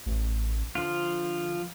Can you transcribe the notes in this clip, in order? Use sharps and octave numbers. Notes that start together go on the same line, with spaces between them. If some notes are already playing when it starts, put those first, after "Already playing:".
A1
D3 F3 F4